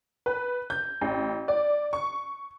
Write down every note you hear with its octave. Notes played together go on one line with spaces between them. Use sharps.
B4
G6
A1
D5
C#6